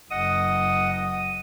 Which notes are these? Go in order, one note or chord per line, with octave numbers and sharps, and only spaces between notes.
F#1 D#5 F#5 D#6